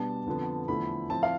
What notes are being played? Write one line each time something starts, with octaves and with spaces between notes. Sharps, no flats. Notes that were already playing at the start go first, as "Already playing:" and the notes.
Already playing: B2 G3 B3 D4 A5
F2 D3 F3 B3
E2 D3 F3 A3 B5
A2 F3 C4 A5
F5